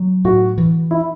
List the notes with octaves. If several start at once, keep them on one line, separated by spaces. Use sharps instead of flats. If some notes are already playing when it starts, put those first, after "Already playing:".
Already playing: F#3
A2 F#4
E3
E4